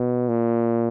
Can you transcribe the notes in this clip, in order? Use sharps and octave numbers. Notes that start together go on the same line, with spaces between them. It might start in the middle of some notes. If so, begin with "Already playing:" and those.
Already playing: B2
A#2